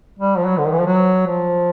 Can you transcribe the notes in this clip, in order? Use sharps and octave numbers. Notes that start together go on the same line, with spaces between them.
G3
F3
F#3
D3
D#3
E3
F3
F#3
F3